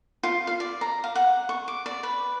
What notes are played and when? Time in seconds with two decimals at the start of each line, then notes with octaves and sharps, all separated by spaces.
0.23 F4
0.47 F5
0.60 D5
0.81 A#5
1.04 F5
1.15 F#5
1.49 C#6
1.68 D6
1.86 D5
2.03 B4